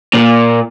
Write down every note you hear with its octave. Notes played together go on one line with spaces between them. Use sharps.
A#2